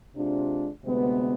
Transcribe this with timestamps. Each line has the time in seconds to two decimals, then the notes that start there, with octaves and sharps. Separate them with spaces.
0.14 C3 G#3 D4 F4
0.83 D2 C3 G#3 B3